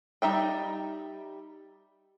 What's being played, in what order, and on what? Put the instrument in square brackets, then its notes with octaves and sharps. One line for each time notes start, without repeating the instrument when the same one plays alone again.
[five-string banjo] G3 D#4 E5 G5